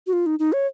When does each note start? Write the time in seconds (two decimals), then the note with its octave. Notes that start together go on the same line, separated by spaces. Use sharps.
0.07 F#4
0.13 F4
0.26 D#4
0.39 D#4
0.53 C#5